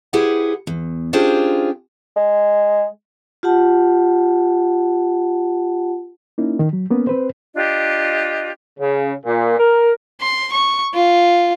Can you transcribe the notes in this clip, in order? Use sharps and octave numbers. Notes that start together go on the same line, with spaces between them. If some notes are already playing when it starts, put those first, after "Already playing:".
E4 G4 G#4 B4 C5 F#5
E2
C#4 D4 F4 G4 G#4 C5
G#3
F4 G4 F#5 A5
A#3 C#4 D#4 E4
D#3
F#3
A#3 B3 C#4
C4 B4 C5
D4 F4 G4 D#5
C#3
A#2
A#4
C6
C#6
F4